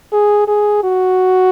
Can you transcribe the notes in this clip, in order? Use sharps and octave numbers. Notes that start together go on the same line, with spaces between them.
G#4
G#4
F#4